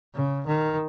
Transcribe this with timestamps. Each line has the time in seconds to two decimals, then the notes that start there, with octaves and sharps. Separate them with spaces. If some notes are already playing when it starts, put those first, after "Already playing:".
0.15 C#3
0.47 D#3